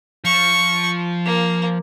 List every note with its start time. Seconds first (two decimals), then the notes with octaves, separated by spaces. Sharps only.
0.24 F3 C#6
1.25 A#3